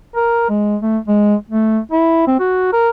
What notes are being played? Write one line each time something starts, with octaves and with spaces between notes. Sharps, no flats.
A#4
G#3
A3
G#3
A3
E4
C4
F#4
A#4